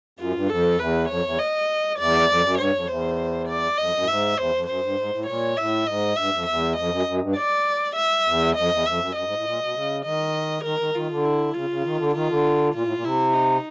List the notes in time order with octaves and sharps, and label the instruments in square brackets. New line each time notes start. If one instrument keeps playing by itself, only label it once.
[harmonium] F#2 [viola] F4
[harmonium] G#2
G2
[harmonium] F2 [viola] A4
[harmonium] E2 [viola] B4
[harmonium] F2 [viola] C#5
[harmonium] E2
[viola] D#5
[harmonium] E2 [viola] D5
[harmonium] F2
F#2
[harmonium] G2 [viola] C#5
[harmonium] F2
[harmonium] E2 [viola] C5
[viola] D5
[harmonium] F2 [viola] D#5
[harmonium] F#2
A2
[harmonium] G#2 [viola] E5
[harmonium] E2 [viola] C5
[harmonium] F2
[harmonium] F#2 [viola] C5
[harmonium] G2
G#2
A2
[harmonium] A#2 [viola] C#5
[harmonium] A2 [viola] E5
[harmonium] G#2 [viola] D#5
[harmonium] G2 [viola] E5
[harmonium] F2
[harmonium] E2 [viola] E5
[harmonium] F2 [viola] D#5
[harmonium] F#2
F#2
G2
[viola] D5
E5
[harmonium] E2
[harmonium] F2 [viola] D#5
[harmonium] E2
[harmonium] F2 [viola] E5
[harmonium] F#2
[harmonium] F#2 [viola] D#5
[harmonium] G#2
A2
A#2
B2
C#3
[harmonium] D#3 [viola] D#5
[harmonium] D#3 [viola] A#4
[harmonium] D#3
[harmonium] D#3 [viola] F4
[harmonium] D3
[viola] E4
[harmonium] C#3 [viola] F4
[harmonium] C#3
D#3
D3
[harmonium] D#3 [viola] F4
[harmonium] D3
[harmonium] A#2 [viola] F4
[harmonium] A2
A#2
[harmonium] C3 [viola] E4
[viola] D#4